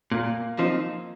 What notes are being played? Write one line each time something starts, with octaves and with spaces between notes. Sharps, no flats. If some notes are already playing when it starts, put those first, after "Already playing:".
A#2 A#3
F3 C4 D#4